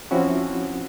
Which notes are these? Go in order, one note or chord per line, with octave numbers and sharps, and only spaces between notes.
F3 C4 C#4 E4 F#4